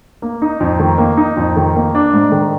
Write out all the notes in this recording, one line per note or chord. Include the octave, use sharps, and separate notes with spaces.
A#3
D#4
F2
D#3
A#3
D#4
F2
D#3
A#3
D4
G#2
D#3